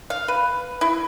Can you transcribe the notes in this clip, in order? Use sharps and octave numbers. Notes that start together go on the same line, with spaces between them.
F5
B4
E4